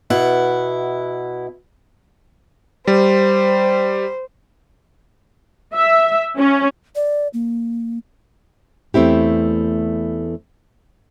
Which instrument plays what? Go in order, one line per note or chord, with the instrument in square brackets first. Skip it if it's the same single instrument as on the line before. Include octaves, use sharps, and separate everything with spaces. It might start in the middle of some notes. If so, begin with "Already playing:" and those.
[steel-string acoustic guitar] B2 E4 F#5
[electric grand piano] G3 [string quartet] C5
[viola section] E5
C#4
[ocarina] D5
A#3
[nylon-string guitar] E2 A3 C4 E4 G4